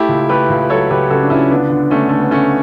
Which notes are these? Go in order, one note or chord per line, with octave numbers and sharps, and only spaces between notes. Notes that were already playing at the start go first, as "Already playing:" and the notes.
Already playing: A3 E4 G4
C#2
A3 G4 B4
C#2
F#3 A4 C#5
C#2 G4 B4
C#3 F#4 A4
D4
C#2 C#4 E4
D3 B3 D4
D3
D3 A3 C#4
D3 A3
B3
D3 A3 C#4